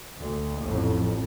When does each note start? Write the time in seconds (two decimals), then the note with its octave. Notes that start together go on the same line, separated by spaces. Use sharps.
0.18 D2
0.62 A1 F2 A2